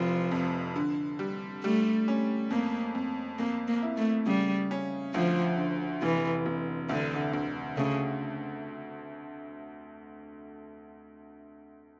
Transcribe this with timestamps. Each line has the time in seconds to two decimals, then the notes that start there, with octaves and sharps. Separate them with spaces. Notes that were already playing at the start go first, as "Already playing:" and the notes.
Already playing: F1 E3 F3
0.31 F2
0.76 D3
1.19 G3
1.63 G3 A3
2.08 C#4
2.51 F2 A#3
2.95 F2
3.39 F2 A#3
3.68 A#3
3.83 E4
3.97 A3
4.26 C#3 G3
4.71 C#4
5.14 D2 F3
5.57 D3
6.02 F1 E3
6.46 F1
6.89 D2 D3
7.33 D2
7.77 C#3 A3